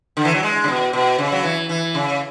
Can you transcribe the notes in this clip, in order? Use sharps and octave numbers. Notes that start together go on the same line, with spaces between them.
D3
E3
F#3
G#3
C#3
B2
B2
C#3
F#3
E3
E3
C#3